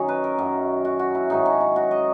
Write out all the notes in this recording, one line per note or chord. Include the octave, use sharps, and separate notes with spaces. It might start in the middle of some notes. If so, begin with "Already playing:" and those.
Already playing: F#2 D#3 F#3 C#4 D#4
B4
A#4
F#2 D#3 F#3
F#4
F#4
E4
G#2 D#3 F#3 D#4
C#4
D#4
F#4
D#5